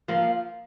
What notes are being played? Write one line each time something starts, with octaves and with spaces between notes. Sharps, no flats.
F3 A#3